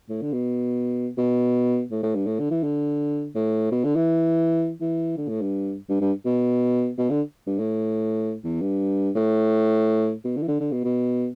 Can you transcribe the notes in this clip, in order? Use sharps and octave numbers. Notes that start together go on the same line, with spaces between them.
A2
D3
B2
B2
A2
A2
G2
A2
D3
E3
D3
A2
B2
D3
E3
E3
D3
A2
G2
G2
G2
B2
B2
D3
G2
A2
E2
G2
A2
B2
D3
E3
D3
D3
B2
B2